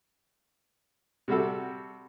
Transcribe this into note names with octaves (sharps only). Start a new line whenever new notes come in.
C3 G3 F#4 A4